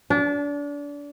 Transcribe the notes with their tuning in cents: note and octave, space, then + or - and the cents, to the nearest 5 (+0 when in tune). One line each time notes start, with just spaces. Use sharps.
D4 -30